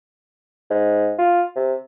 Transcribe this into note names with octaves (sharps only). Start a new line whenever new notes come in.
G#2
F4
C3